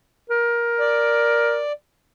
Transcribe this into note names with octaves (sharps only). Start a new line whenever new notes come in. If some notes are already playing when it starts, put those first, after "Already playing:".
A#4
D5